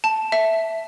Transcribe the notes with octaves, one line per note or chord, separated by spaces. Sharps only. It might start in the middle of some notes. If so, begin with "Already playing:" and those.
A5
E5